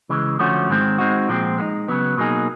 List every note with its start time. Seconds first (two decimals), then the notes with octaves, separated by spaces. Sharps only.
0.09 C#3 E3 G#3
0.39 D3 F3 A3 C#4 F#4
0.69 G#2 D#3 G#3 C4
0.98 G#3 C4 D#4 F#4
1.29 A#2 F3 G#3 C4
1.58 G#3 B3 D#4
1.88 C#3 F#3 B3
2.17 B2 F#3 A#3 D#4 G#4